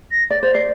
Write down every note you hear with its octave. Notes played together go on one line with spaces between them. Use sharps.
A#6
D5 A6
C5 A6
D5 C7